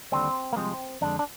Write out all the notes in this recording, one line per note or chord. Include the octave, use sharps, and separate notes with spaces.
D#2 D3 G3 C4
A#3
C2 C3 F3 G#3 C4
F2 D3 G#3 D4
D4